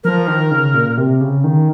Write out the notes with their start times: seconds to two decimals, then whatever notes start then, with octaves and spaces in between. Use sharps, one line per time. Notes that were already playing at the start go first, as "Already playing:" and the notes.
0.04 F3 A#4
0.28 D#3
0.51 C#3
0.74 A#2
0.98 C3
1.21 C#3
1.44 D#3